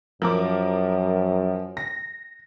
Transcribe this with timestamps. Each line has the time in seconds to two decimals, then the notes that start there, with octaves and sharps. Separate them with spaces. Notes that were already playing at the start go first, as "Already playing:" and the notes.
0.22 F#2 F3 A#4 D6
1.77 A#6